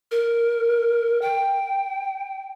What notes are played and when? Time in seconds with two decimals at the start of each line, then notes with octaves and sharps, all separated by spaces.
0.11 A#4
1.22 G5